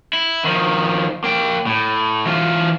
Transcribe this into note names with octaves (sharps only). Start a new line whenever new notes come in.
E4
D#3 F3
A#3 G5
A2
E3 F4